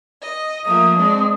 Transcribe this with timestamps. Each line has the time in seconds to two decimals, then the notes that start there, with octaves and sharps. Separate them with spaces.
0.22 D#5
0.65 F3 A3 A#3 D#6
0.97 G#3 C4 D4